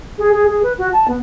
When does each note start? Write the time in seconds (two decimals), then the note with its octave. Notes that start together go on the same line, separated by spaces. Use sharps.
0.18 G#4
0.33 G#4
0.48 G#4
0.63 B4
0.78 F#4
0.93 A5
1.08 B3